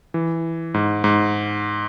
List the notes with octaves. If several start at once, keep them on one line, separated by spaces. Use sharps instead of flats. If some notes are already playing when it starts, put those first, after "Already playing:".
E3
G#2
G#2